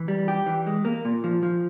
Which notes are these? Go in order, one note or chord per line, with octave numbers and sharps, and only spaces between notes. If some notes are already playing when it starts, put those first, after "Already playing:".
Already playing: E3
G3
G4
E3
G#3
A#3
A#2
F3
F3